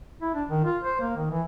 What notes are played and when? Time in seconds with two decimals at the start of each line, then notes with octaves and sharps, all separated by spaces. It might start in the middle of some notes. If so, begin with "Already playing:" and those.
0.22 E4
0.34 D4
0.49 D#3
0.64 F4
0.84 C5
1.01 A#3
1.16 D#3
1.31 E3